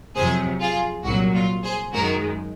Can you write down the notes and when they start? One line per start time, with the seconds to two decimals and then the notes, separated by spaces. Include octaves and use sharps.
0.16 F2 C3 F#3 G#4 C5
0.61 F4 G#4
1.05 C2 A#2 F#3 F#4
1.35 F4
1.64 G#4 C5
1.93 F#2 D#3 G#3 F#4 A#4